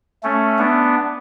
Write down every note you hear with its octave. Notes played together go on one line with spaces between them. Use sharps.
A3 C#4
B3 D4